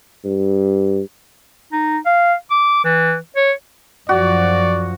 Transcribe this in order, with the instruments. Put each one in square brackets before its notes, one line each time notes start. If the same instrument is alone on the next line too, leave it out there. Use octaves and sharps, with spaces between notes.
[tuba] G2
[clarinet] D#4
F5
D6
E3
C#5
[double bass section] F#2 F3 [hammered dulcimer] F#4 [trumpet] D5